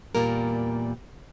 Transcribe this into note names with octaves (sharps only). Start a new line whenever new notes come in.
E2 A#2 G3 A#3 A#4